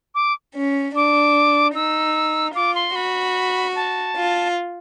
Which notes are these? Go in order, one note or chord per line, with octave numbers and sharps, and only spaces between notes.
D6
C#4
D4 D6
D#4 E6
F4 D6
C6
F#4 B5
A5
F4